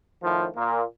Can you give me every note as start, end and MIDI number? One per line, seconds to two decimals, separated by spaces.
0.23 0.47 45
0.23 0.47 51
0.23 0.47 53
0.56 0.82 46
0.56 0.82 58